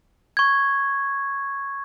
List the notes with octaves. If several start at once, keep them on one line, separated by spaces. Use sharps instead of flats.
C#6 G#6